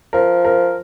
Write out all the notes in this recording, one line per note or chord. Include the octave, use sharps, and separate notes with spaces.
F3 A#4
A#4